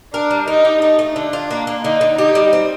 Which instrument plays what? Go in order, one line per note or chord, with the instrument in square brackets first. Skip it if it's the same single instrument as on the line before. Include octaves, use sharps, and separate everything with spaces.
[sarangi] D4 [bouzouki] A#4
[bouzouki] G3
[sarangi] D#4 [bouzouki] A#4
[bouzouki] G4
[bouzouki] A3 [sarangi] D#4
[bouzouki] A3
[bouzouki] D3 [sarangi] D4
[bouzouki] F4
A#3
A#3
[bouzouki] D3 [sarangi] D#4
[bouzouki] D3
[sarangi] D#4 [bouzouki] G4
[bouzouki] G3
C4